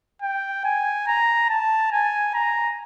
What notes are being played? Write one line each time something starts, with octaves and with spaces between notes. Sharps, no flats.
G5
G#5
A#5
A5
G#5
A#5